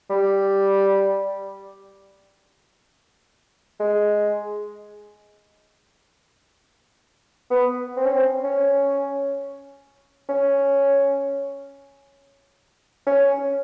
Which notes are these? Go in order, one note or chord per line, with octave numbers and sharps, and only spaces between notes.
G3
G#3
B3
C4
C#4
C4
C#4
C#4
C#4